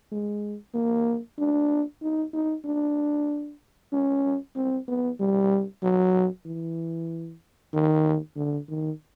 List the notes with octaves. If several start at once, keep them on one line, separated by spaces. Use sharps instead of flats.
G#3
A#3
D4
D#4
D#4
D4
C#4
C4
B3
G3
F#3
E3
D#3
D3
D#3